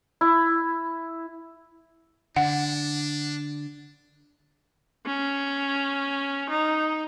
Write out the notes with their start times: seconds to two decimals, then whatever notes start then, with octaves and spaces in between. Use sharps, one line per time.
0.21 E4
2.36 D3 D4 F#5
5.06 C#4
6.49 D#4